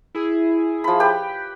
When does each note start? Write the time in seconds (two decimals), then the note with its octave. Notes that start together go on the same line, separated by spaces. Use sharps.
0.15 E4 G#4
0.84 F3 B5
1.00 G4 B4 G5